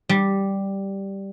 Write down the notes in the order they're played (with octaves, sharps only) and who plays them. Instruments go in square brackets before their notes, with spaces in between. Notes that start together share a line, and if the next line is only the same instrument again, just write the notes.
[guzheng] G3